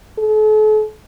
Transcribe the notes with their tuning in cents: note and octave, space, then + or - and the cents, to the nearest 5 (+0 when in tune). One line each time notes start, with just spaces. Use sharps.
A4 -40